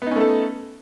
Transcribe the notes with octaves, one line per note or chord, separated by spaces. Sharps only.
A3 B3 C#4 D#4 A4